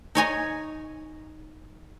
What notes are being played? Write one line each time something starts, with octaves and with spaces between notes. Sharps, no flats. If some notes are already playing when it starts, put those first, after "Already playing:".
D#4 C#5 G#5 A#5